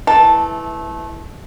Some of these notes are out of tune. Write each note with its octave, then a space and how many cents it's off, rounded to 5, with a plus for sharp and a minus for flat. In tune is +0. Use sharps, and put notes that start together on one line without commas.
E3 +0 A3 -20 A5 +0